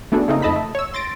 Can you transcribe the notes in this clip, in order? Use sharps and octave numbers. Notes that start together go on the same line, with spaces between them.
A3 B3 D4 F#4 G#4 A4
C#3 A3 A#3 C4 D#4
F2 A3 D#5 A5 B5 B6
A3
C#5 E6
C6 A6 A#6 D7